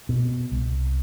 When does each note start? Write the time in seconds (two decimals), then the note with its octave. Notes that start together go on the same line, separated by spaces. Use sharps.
0.09 B2
0.52 C2